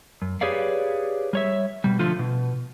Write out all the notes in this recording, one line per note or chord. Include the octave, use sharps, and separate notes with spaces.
F#2
G4 G#4 B4 C#5 D5 F5
G3 C#5 E5
B2 G3
D3 F3 A3 F4
B2